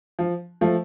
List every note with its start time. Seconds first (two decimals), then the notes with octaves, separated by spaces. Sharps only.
0.19 F3
0.61 F3 A3